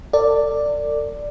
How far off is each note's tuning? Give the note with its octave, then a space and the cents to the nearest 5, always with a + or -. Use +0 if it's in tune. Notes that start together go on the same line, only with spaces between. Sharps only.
A4 +45 D5 +0